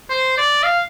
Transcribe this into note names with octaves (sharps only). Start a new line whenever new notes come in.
C5
D5
F5